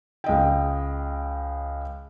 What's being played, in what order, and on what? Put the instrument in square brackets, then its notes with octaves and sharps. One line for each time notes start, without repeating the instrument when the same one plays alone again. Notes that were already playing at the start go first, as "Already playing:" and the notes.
[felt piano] C#2 D#5 G5